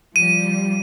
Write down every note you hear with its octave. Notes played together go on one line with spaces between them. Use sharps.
F3 G3 D#7